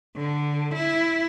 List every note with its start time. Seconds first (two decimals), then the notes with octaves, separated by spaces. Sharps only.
0.15 D3
0.75 E4